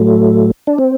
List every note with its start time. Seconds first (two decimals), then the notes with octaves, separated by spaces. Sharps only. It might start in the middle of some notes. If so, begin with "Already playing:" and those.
Already playing: A2 F#3 A3
0.67 D4
0.78 C4